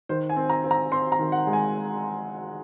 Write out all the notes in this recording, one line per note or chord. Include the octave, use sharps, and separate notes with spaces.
D#3 C5
G#5
C4
A#5
C4
A#5
C4 C6
A#5
D#3
F#5
G#3
G#5